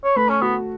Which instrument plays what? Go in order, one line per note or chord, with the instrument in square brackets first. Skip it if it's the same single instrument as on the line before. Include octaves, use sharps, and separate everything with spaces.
[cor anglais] C#5
[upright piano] A3 [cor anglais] B4
[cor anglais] C#4
[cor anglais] B3 [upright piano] F#4